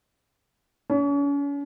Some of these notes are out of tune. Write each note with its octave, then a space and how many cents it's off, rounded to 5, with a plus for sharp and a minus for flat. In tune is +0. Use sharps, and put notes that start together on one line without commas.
C#4 +40